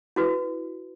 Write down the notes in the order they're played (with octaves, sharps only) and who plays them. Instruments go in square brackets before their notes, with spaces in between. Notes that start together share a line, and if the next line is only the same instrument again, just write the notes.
[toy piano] E4 F#4 B4